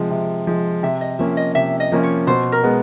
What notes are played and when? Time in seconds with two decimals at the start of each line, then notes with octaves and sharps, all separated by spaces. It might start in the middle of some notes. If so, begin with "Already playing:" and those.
Already playing: C3 F3 G#3
0.10 C3
0.47 F3 G#3
0.83 C3 E5
1.01 D#5
1.19 F3 A#3 C#4 E5
1.37 D#5
1.55 C3 E5
1.80 D#5
1.92 F3 A#3 C#4
2.03 C#5
2.27 B2 C5
2.52 A#4
2.64 G#3 B3